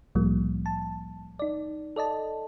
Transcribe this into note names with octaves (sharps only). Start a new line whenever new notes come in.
C2 A2 F3 G3 A#3
A5
D#4 D5
A4 D5 D#5 A5